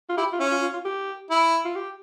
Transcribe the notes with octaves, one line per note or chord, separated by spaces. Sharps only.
F4
E4 G4
F4
C#4 E4
F4
F4
F4
G4
E4
F4
G4